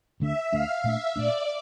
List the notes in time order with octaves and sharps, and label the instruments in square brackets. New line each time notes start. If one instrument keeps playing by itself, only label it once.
[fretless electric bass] D2 D3 A3 D4 [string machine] E5
[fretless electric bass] D2 D3 A3 D4 [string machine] F5
[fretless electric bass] A#2 A3 D4 [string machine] E5
[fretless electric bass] A#2 A3 D4 [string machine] D5